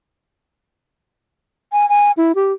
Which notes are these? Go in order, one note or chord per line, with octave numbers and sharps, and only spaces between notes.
G#5
G#5
E4
G4